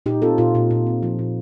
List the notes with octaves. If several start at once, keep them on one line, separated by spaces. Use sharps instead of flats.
A#2 D#4 G4
C4 F4 A4
A#2 F4 A4
A#2
A#2
C4
F3
A#2